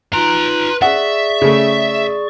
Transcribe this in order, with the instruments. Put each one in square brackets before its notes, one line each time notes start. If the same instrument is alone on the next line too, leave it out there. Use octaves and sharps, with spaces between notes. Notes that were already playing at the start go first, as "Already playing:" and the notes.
[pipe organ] D#4 F4 [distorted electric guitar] B4 A#5
[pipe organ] G#4 D5 C#6 [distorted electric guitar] E5 [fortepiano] F#5
[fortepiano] C#3 A3